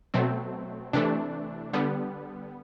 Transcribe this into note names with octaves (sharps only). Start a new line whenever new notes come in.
B2 F#3 A3 C4
C3 E3 A3 D4
D3 G3 B3